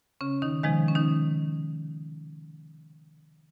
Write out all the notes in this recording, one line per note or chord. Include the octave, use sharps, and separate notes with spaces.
C#3 C#4
D#3 D#4
C3 D#3 F3 G#3 D#4
C#4
D#3 D#4